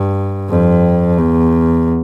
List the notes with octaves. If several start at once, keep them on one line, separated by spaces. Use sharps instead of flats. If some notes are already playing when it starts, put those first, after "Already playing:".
Already playing: G2
F2
E2